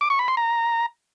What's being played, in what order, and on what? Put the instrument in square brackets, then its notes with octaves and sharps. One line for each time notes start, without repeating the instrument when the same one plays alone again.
[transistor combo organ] D6
C#6
B5
C6
A#5